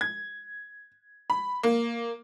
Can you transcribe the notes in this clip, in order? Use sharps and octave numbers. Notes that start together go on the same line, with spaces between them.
G#6
B5
A#3